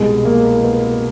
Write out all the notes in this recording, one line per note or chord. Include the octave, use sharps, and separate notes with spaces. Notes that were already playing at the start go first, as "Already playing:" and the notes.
Already playing: C2 B2 G3 G#3
A#3
B3